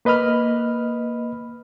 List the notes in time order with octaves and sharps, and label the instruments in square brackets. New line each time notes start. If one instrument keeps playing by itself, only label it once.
[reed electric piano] A#3 B4 D#5 B5 F6